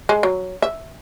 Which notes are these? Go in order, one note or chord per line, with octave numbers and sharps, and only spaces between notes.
G#3
F#3
E5